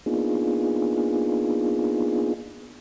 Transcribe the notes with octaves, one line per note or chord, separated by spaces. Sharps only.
A#3 B3 D4 D#4 F4 G#4